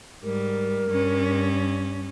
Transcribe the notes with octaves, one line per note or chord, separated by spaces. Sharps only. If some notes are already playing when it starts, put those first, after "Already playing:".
G#2 G3 A#4
G2 C#4